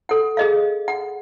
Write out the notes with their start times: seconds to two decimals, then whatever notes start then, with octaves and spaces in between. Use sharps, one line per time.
0.09 A4 F#5
0.37 G#4 D#5 F5
0.88 F#5